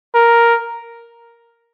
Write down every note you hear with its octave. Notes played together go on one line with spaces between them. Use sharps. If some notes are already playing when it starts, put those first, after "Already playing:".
A#4